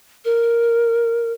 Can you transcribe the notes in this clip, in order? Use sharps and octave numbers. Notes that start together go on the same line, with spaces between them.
A#4